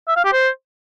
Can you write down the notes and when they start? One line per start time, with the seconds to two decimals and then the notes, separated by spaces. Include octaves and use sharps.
0.08 E5
0.16 F5
0.25 G4
0.33 C5